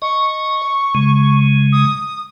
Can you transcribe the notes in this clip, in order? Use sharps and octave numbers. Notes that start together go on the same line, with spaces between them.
D#5 C#6
C#3 G#3
D#6